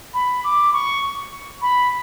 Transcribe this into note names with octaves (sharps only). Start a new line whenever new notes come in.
B5
D6
C#6
B5